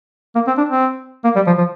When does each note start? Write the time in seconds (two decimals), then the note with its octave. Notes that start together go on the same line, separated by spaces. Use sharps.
0.35 A#3
0.47 C4
0.58 D4
0.69 C4
1.24 A#3
1.35 G3
1.47 F3
1.58 F3